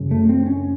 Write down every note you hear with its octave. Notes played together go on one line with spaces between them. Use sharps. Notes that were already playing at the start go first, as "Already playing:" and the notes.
Already playing: F#2 C#3
A3
C4
C#4